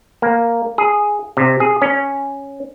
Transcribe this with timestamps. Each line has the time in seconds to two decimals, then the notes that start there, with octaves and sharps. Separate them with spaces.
0.22 A#3
0.78 G#4
1.37 C3
1.60 G#4
1.82 C#4